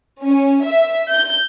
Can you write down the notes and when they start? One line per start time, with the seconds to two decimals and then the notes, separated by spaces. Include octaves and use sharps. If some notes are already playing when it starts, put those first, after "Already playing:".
0.24 C#4
0.66 E5
1.13 G6